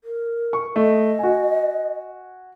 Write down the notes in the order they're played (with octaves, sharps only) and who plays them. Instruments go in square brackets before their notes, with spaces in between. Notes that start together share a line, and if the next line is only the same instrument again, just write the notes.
[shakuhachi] A#4
[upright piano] C#6
[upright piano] A3 [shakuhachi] D#5
[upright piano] F#4 G#5